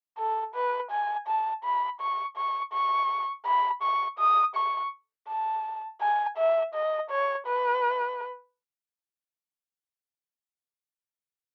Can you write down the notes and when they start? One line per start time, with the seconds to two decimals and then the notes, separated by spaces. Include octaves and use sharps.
0.18 A4
0.55 B4
0.91 G#5
1.27 A5
1.64 B5
2.01 C#6
2.37 C#6
2.73 C#6
3.46 B5
3.83 C#6
4.19 D#6
4.55 C#6
5.28 A5
6.01 G#5
6.37 E5
6.74 D#5
7.10 C#5
7.47 B4